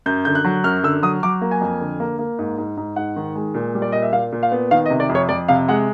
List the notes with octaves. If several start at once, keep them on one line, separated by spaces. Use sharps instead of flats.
F#2 G6
D3 G6
F#6
F#3
F#2 F6
D3 E6
F#3 D#6
F#3 D6
A#3
G#5
F2
D3
A#3
A#3
G#2
G#2
G#2
G#2 F#5
D#3
G#3
A#2
G3
D5
A#2 D#5
E5
A#2 F5
A#2
F5
B3
D#3 F5
D#5
C3
D5
F2
C#5
F2 D5
C3 F5
G#3 F#5